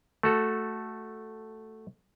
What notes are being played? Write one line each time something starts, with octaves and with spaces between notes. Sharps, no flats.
A3 F#4 A4